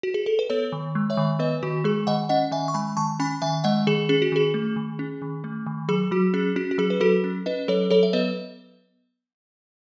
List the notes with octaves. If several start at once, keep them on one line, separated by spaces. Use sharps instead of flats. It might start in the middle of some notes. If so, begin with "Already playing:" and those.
F#4
G#4
A4
B4
B3 A4 C#5
D#3
G#3
C#5 E5
D#3
B3 B4 D#5
D#3 F#4
G#3 G#4
D#3 D#5 F#5
C#4 D#5 F#5
D#3 E5 G#5
C#6
G#3 G#5 B5
D#3 A5 C#6
C#4 G#5 B5
D#3 E5 G#5
G#3 D#5 F#5
D#3 G#4
C#4 G#4
F#4
D#3 G#4
A3
D#3
C#4
D#3
A3
D#3
F#3 G#4
F#3 F#4
C#4 G#4
C#4 F#4
F#4
F#3 G#4
B4
F#3 F#4 A4
C#4
C#4 B4 D#5
F#3 A4 C#5
F#3 A4 C#5
E5
B3 B4 D#5